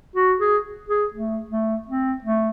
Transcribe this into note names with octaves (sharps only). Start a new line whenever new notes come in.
F#4
G#4
G#4
A3
A3
C4
A3